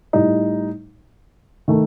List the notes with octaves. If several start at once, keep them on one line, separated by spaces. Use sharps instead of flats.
A2 G3 D#4
D#3 A3